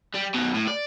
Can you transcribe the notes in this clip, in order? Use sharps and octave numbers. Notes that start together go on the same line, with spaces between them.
G3
F#2 B2
A2
D5